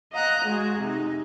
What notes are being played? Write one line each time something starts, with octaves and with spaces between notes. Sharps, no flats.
D#5 F5 F#5 A#5 F#6
G#3 F#4 G#4
C3 D#4